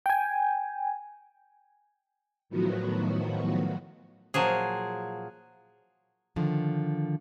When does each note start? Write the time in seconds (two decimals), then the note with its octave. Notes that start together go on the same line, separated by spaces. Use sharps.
0.06 G5 G#5
2.49 A2 D#3 F3 F#3 B3 F#4
4.34 A#2 F3 F#3 G#4
6.36 D3 D#3 F3